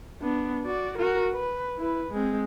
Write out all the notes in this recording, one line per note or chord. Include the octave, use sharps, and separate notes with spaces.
B3 D4
F#4 D5
F#4 A#4
B4
E4 B4
G#3 C4